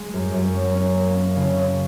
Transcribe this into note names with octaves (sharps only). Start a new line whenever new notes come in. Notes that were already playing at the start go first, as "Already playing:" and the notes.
Already playing: G#3
F#2
F#2
C#4
C#4
A#3
C#4
C#3
C#4